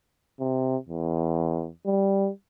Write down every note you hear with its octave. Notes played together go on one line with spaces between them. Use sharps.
C3
E2
G3